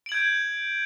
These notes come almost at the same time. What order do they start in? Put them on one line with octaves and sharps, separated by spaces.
D7 F#7 G#6 G6